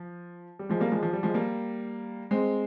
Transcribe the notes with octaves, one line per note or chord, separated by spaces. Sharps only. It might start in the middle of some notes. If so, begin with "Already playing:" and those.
Already playing: F3
G3
F3 G#3
G3 A#3
F3 G#3
F3
G3
F3 G#3
G3 A#3
G#3 C4